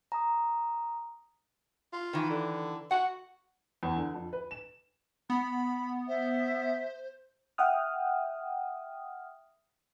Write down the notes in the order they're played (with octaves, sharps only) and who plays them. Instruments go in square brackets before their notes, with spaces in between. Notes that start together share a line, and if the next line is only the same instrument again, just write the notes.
[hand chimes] A#5 D#6
[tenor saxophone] F4
[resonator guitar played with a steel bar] D#3 E3
[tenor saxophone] D3
[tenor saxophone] F#4 [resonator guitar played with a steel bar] F#5
[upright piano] E2
D3
F2
B4
E7
[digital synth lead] B3 [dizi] B5
[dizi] C5 [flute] E5
[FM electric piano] E5 F#5 G5 D#6 F6